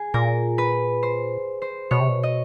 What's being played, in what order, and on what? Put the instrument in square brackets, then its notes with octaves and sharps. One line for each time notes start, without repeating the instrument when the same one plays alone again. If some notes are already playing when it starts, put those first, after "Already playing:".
Already playing: [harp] G#4
[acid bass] A#2 [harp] A#4
[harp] B4
C5
C5
[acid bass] B2 [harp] C#5
[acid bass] C3
B2
[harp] D#5